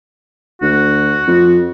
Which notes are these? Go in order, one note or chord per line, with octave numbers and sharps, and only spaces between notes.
D2 F#4
F2